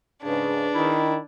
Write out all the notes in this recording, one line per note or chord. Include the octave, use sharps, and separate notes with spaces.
G#2 C#3 D4 G#4 B4
D#3 E4